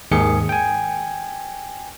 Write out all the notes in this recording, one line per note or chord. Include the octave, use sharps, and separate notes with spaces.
D#2 G#2 D#3 G#4 C#7
G5 G#5